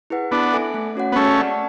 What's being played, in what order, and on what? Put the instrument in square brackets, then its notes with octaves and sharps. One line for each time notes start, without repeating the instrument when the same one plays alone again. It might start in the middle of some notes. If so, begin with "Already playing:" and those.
[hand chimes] E4 G#4 B4 F#5
[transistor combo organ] B3 D4 [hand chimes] E4
[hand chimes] A4 E5 G#5
A3
C#4 F#4 C#5 F#5
[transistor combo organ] B3
[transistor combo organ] A3 C#4 [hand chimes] G#4
[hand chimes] D5 F#5 A5